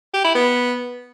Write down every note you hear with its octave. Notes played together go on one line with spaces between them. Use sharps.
G4
E4
B3